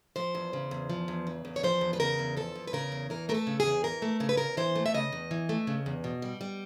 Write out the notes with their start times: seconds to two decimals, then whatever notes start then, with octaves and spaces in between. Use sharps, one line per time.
0.16 F3 C5
0.35 E2
0.53 C#3
0.71 E2
0.90 F3
1.08 E2
1.27 C#3
1.45 E2
1.56 C#5
1.63 F3 C5
1.81 E2
1.93 B4
2.00 C#3 A#4
2.19 E2
2.37 F3 A4
2.55 E2
2.67 B4
2.73 C#3 A#4
2.92 E2
3.10 E3 A#4
3.29 A3 A#4
3.34 A4
3.47 C#3
3.60 G#4
3.65 E2
3.84 E3 A#4
4.02 A3
4.20 C#3 A#4
4.29 B4
4.37 E2 A#4
4.57 E3 C5
4.76 A3
4.86 E5
4.94 C#3 D#5
5.13 E2
5.31 E3
5.49 A3
5.67 C#3
5.86 E2
6.04 B2
6.22 G3
6.41 G3